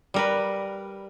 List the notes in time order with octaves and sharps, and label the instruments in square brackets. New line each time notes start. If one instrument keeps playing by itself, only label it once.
[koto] G3 A#4 B4